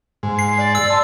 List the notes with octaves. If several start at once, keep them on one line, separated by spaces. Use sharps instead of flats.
G#2
C7
D5
E6
A5 C6